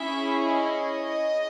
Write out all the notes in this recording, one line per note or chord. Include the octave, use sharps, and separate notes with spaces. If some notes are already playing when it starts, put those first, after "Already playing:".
Already playing: C#4 E4 G#4 E5
D#5